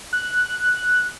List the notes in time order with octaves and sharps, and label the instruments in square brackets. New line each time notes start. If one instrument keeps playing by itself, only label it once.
[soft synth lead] F#6